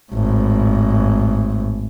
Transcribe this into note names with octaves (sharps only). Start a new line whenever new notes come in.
G#1 A2